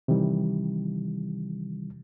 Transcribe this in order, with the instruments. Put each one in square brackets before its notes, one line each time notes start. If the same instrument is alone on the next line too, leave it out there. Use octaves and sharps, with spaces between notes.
[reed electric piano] C3 D#3 E3 G3